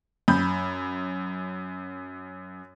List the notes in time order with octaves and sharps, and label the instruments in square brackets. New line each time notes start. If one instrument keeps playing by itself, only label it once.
[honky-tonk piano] F#2 B5 G6